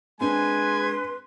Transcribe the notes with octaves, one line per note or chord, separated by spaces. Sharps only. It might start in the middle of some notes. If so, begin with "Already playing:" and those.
G#3 C4 D4 B4 G#5 C6